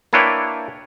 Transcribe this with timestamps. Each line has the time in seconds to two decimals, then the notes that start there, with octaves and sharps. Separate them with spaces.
0.13 A#3 D4 E4 B4 C#5 G5